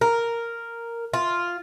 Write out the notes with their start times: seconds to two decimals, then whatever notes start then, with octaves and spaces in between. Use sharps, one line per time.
0.01 A#4
1.14 F4